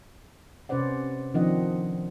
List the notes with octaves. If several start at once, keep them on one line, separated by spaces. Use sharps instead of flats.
C3 C#4 B4 C5 D5 F#5
D#3 F3 C4 D4 D#5 F#5